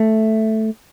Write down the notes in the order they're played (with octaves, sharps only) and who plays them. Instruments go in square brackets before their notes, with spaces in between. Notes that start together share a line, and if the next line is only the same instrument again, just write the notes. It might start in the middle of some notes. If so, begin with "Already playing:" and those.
Already playing: [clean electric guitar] A3